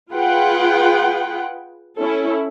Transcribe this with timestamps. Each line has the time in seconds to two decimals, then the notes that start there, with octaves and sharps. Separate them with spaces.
0.12 F4 G#4 B4 F#5 G5
1.99 C#4 E4 A4